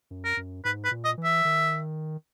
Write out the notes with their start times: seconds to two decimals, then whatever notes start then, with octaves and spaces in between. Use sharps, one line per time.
0.11 F#2
0.25 A#4
0.37 F#2
0.65 G#2 B4
0.84 B4
0.91 A#2
1.05 D#5
1.18 E3
1.24 E5
1.45 D#3